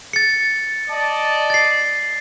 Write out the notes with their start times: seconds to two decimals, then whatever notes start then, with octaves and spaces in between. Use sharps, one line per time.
0.13 A6 C#7
0.90 D5 D#5 A5
1.50 A6 C7